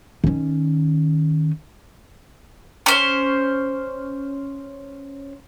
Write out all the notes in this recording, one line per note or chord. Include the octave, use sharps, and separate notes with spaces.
D#3 C#4
C#4 C5